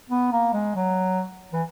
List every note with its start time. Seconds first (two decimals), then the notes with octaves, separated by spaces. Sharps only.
0.10 B3
0.32 A#3
0.53 G#3
0.76 F#3
1.53 E3